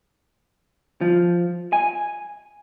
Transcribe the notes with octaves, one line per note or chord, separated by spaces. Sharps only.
F3
G#5